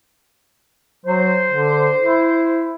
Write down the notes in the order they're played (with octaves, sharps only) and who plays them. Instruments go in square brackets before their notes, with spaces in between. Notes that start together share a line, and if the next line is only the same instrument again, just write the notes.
[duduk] F#3 [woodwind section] C5
[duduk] D3
E4